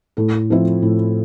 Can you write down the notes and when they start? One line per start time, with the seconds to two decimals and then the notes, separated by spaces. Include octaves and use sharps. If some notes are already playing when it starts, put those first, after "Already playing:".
0.17 A2 A4
0.50 F3 C4 E4
0.82 A2